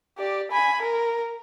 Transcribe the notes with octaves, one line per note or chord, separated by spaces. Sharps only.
G4 D5
G#5 B5
A#4